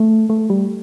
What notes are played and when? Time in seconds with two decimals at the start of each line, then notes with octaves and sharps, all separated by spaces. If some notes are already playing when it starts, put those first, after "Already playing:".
Already playing: A3
0.30 A3
0.50 G3